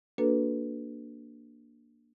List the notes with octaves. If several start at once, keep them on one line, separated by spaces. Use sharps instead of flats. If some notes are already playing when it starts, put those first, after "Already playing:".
A#3 D4 F#4 A4 B4